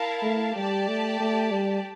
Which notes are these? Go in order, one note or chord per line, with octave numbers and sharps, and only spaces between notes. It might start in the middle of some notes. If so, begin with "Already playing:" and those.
Already playing: E4 A#4 F5 A5
A3
G3 G4 D5 A5
A3
A3
G3